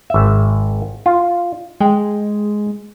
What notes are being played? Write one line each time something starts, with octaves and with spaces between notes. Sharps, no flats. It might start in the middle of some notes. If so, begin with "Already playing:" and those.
G#1 E5
F4
G#3 G5